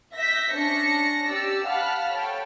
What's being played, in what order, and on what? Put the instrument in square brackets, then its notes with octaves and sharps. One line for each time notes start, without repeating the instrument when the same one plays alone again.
[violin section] E5 G6 A#6 B6
C#4 D4 A#6 C#7
G4 D5 E6
F5 F#5 A5 B5 F6
A4 C#5 G5